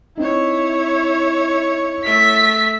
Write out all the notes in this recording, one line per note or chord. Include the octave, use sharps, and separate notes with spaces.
C4 D#4 E4 C#5
A3 E5 B6